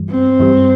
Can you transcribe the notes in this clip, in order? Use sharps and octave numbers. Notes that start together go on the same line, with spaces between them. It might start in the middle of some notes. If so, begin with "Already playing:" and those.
Already playing: G2 E3 G3
C4
G2 E3 G3